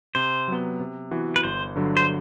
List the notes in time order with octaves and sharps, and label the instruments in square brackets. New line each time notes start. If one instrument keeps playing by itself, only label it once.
[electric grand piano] C3 [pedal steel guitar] C5
[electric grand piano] F#3 B3
C3
E3 B3 F#4
[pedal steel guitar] B4
[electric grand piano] G1 [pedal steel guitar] C5
[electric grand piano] G2 D3 F#3
[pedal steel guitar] C5